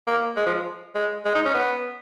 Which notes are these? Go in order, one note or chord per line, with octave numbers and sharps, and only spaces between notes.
A#3
G#3
F3
G#3
G#3
D#4
C#4
B3